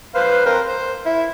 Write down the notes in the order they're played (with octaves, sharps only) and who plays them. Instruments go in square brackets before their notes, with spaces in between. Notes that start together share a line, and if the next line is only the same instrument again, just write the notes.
[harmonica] B4 C5 F5
C4 A#4 C5
C5
E4